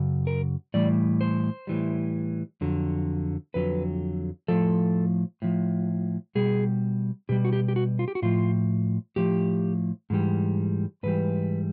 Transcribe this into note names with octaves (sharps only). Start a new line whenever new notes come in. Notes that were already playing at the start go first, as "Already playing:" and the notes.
Already playing: F#2 C#3
A#4
A2 E3 G3 D5
C5
A2 E3 G3
F2 D3 F#3
F2 D3 F#3 B4
A2 F3 A4
A2 F3
B2 G3 G#4
B2 G3 G4
F#4
G4
G4
F#4
F4
G4
F#4
A2 F3 F4
A2 F3 G4
G#2 E3 G3
G#2 E3 G3 B4